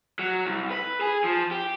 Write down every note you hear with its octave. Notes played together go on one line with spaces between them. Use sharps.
F#3
C2
B4
G#4
F3
G4